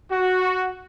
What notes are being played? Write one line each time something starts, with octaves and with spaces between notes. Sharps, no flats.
F#4